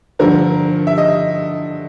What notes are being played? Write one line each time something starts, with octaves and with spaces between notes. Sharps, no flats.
G2 D3 F3 A#4
E5
D#5